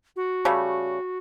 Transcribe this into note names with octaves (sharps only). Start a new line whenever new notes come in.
F#4
C#3 G3 A3